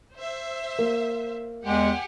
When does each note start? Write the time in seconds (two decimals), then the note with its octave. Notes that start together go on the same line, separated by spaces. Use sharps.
0.14 C5 E5
0.79 A#3
1.66 E2 G#3 G4 F#5 G#5